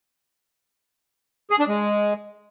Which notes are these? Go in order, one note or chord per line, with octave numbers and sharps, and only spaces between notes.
G#4
D4
G#3